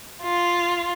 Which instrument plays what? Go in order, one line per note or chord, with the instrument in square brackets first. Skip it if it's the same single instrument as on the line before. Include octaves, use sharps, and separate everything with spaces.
[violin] F4